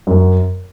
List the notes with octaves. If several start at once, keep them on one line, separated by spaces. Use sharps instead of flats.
F#2